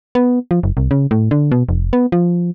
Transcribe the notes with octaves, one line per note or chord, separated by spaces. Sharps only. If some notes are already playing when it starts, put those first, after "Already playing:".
B3
F3
F#1
C2
C#3
A2
D3
B2
F1
B3
F3